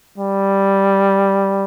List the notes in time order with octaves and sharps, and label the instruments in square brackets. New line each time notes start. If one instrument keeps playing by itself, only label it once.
[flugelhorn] G3